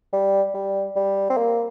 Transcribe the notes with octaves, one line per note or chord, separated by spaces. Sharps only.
G3
G3
G3
C4
A#3